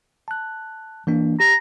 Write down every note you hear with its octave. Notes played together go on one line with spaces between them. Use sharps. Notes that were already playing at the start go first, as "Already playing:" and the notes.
A5 F#6
E3 A#3 D4
G4 A#5